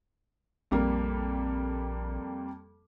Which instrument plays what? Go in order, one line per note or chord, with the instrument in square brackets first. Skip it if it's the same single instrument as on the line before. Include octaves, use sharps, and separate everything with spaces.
[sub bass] A#1 [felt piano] F2 G3 A#3